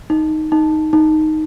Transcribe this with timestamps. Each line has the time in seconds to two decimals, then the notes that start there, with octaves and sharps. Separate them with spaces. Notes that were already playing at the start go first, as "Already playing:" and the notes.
0.10 D#4
0.52 D#4
0.93 D#4